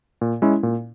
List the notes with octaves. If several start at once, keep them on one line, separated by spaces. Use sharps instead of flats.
A#2
G#3 C#4 E4
A#2